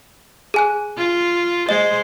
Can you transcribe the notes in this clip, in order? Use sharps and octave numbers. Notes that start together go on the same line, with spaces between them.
G#4 G#5 F#6
F4
G#3 C5 D#5